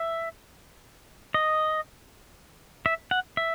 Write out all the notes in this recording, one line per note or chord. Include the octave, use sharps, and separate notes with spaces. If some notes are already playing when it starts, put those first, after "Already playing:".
Already playing: E5
D#5
E5
F#5
E5